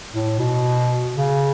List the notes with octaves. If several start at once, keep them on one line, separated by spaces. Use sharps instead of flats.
A2
B2
C#3